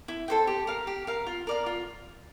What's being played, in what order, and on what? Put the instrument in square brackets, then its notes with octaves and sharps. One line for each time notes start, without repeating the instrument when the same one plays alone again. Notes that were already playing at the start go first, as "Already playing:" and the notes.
[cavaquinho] E4
A4 C5 G5
G4
A#4 F5
G4
A#4 F5
F4
A#4 D5 F5
F4